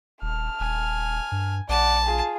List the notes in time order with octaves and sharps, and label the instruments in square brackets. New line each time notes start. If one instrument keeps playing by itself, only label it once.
[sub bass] D#1 [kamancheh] A5 F6
[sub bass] D#1 [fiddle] G#5
[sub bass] G2
[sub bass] A#1 [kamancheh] D5 F#5 [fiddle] A5
[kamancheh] F4 G#4